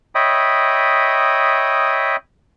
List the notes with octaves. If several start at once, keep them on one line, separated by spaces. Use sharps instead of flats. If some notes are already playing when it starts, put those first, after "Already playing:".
C#5 D#5 E5 G5 B5 D#6